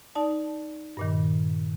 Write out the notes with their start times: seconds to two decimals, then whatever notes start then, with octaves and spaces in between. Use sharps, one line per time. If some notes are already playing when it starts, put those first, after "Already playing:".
0.15 D#4 D5 A5
0.97 G2 A#2 D#3